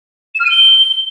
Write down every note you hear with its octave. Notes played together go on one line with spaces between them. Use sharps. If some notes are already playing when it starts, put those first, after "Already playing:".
E7
F6
D#7
G7